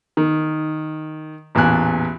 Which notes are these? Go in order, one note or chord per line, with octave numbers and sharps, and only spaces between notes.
D#3
A1 E2 A#2 G#5 F#6